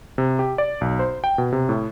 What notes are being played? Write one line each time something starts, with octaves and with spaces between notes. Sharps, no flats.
C3
G4
D5
B1
C5
G5
B2
C3
A2